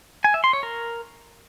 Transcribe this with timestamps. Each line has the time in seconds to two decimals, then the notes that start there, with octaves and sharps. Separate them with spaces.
0.24 G#5
0.34 E5
0.44 C6
0.53 C#5
0.63 A#4